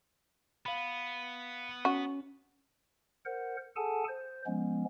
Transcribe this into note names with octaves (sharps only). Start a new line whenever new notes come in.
B3 F5 B5
C#4 F#4
A#4 C5 F#5
G#4 A4 F#5 G#5 A5
C5
F3 G#3 B3 C#4